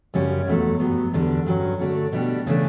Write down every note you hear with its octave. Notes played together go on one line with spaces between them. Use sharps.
F#2 C#3 G3 C#4
E2 B2 F#3 A3
G2 F#3 B3
E2 D3 G3 D4
G2 F#3 C#4
D3 A3 D4 F#4
B2 G3 D4 G4
C#3 E3 A3 D4